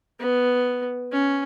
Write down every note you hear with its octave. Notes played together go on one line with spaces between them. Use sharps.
B3
C#4